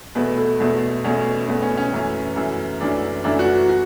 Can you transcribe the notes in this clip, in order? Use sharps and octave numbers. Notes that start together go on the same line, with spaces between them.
E2 B2 A3 B4
A4
E2 B2 A3
E2 B2 A3 C#4
E2 B2 A3 B3
C#4
C#4
F#2 E3 A3
F#2 E3 A3
F#2 E3 A3 D4
F#2 E3 A3 D4
F#4
F#4